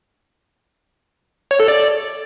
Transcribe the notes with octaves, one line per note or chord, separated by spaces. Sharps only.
C#5
A4
D5